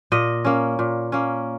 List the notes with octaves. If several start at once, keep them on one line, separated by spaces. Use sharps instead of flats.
A#2 D#5
A#3 C#4
A#2
A#3 C#4